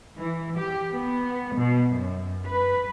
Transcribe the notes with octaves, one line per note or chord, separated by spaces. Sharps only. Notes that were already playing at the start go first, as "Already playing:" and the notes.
E3
G4
B3
B2
F#2
B4